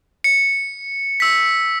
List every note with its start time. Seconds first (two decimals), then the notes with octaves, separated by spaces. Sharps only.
0.24 C#7
1.20 E6 B6